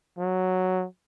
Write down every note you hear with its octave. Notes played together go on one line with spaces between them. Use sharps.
F#3